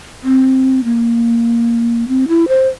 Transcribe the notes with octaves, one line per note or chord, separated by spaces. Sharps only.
C4
A#3
C4
E4
C5